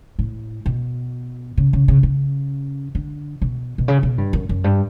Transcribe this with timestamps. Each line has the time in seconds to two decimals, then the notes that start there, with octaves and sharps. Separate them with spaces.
0.19 A2
0.66 B2
1.57 C#3
1.73 C#3
1.88 C#3
2.03 C#3
2.95 D3
3.42 B2
3.78 B2
3.88 C#3
4.03 B2
4.18 G2
4.33 F#2
4.49 F#2
4.64 G2